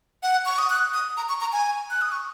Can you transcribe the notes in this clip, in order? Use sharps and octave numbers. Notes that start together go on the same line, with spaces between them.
F#5
C#6
D#6
F#6
D#6
A#5
C#6
A#5
G#5
F#6
D#6
C#6